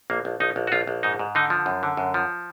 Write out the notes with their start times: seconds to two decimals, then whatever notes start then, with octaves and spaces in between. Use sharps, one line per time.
0.10 A#1 A#3
0.25 A#1
0.40 A#1 D#4
0.56 A#1
0.67 F#4
0.72 A#1 F4
0.87 A#1
1.03 G#2 D#4
1.19 G#2
1.35 D3 D#4
1.50 F3
1.66 F#2
1.83 D3
1.97 F#2
2.14 F3